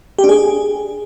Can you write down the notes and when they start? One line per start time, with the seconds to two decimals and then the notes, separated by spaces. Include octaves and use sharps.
0.19 G4
0.24 D4
0.29 G#4